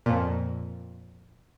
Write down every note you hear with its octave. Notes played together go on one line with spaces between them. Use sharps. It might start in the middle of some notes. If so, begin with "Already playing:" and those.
F2 A#2